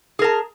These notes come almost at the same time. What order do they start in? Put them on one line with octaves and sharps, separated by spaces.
G#4 A#4 A5